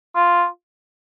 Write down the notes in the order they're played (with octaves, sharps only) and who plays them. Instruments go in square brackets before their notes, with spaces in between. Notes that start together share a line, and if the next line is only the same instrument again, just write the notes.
[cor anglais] F4